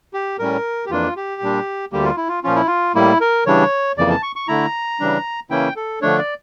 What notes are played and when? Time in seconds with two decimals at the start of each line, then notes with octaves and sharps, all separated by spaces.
0.14 G4
0.39 A2 G3 C#4 A#4
0.86 G4
0.90 F2 E3 A#3 D4 F4
1.16 G4
1.42 A#2 G3 D4
1.92 D2 D3 G3 A#3 G4
2.04 F4
2.16 E4
2.28 F4
2.44 A#2 F3 C#4 F4
2.55 E4
2.67 F4
2.95 A2 G3 A#3 E4
3.21 A#4
3.46 C#3 E3 G3 D4 C#5
3.97 F2 C#3 E3 A#3 D5
4.10 A5
4.23 C#6
4.36 C#6
4.48 D3 A3 E4 A#5
5.00 C#3 E3 G3 D4
5.50 C#3 E3 A#3 C#4 E4 G5
5.76 A4
6.02 D3 F3 A3 D4 C#5
6.19 D5